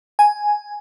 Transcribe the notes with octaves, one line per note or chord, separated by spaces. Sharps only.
G#5